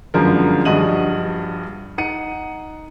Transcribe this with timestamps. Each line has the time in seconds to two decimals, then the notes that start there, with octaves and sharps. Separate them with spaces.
0.14 G1 F#2 D3 F3 G#3 A#4
0.65 A#1 G2 F#4 D#5 D#7 F#7
1.98 D#4 F#5 C#7 D#7